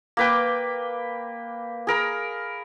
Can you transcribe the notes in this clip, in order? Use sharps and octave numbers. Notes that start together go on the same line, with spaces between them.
A#3 B4 G5
G#4 A#4 B5